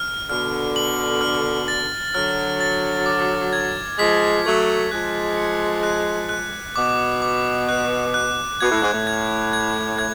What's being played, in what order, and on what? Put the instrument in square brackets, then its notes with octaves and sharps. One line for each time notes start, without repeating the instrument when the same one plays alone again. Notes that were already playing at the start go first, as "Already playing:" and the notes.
Already playing: [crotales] F6
[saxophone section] B2 D3 [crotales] F6
[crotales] F#7
F6
A6
[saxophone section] D3 F#3 [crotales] F6
[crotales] A6
D6
G#6
[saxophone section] F3 G#3 [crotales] B6
[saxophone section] F#3 A3 [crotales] G#6
[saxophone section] F3 G#3 [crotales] F#6
[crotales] C#7
F#6
F#6
[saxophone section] B2 [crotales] D6
[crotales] D6
F#6
F#6
[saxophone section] B2 [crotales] G#6
[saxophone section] A2
G#2
A2
[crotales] G#6
G#6
G#6